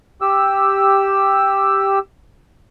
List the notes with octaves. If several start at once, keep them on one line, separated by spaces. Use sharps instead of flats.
G4 E6